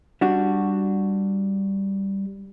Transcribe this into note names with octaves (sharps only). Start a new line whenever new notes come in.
G3 D4 F#4